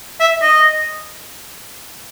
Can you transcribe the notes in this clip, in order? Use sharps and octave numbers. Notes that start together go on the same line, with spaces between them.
E5
D#5